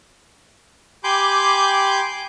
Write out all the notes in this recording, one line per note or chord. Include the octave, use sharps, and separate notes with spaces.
G4 G#5 B5 C6 D6 G6